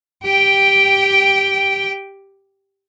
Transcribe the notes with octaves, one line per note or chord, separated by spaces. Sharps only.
G4 G5